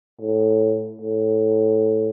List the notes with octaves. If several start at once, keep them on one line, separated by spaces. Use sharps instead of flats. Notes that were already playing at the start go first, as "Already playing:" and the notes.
A2
A2